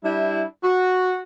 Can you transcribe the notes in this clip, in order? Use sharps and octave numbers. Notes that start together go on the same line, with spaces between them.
G3 D4 E4
F#4